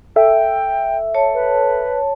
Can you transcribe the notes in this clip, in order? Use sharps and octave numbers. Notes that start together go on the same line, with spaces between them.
A4 E5 G5
C#5 A5
B4